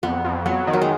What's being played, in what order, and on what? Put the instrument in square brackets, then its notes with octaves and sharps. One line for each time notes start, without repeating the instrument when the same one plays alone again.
[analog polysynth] F2 [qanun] B3
[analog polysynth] F2
[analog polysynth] F#3 [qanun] B3
[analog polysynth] D#3
[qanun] F#3
G#3